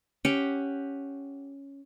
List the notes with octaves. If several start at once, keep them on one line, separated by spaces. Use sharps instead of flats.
C#4 G4 F#5 G5